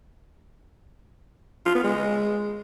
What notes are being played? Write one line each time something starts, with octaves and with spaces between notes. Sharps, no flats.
F4
B3
G#3